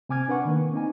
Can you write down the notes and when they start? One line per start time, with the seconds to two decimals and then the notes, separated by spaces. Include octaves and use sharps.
0.09 C3 C4 G#5 D6 F6 G#6
0.28 D4 B4 F#5 C#6
0.45 D#3 A#3
0.74 C4 D#4 G#5